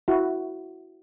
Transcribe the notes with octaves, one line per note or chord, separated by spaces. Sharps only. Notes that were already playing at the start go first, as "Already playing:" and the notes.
E4 F#4